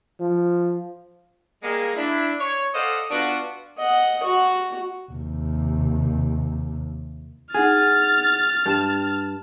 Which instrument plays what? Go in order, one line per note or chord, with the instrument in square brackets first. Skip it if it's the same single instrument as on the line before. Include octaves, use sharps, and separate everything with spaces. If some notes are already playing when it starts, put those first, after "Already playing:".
[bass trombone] F3
[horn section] G3 G#3 A#3
D4 E4
C#5
A4 C5 D5 D#5 F5 F#5
B3 D4 F4 F#4
[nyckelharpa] D#5 F#5
F#4
[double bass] D#2 C3
[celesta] D#4 F#5 G#6 [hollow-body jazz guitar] G#4 [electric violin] F6 A6
[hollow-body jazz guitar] G2 [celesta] G4 A5 E7